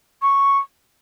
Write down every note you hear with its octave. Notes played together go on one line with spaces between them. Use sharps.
C#6